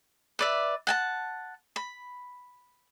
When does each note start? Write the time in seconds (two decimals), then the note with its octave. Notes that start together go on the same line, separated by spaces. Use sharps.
0.39 B4 D5 E5
0.87 F#5 G#5 A5
1.76 B5